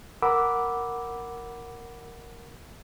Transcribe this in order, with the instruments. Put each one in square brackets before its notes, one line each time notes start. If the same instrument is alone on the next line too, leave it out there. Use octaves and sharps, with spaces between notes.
[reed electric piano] A#4 F#5 B5 D6 E6